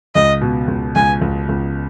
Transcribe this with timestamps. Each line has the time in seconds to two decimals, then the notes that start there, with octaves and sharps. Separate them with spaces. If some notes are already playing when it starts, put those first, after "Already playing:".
0.15 C#2 D#5
0.41 B2
0.68 C#2
0.95 C#2 G#5
1.22 C#2
1.49 C#2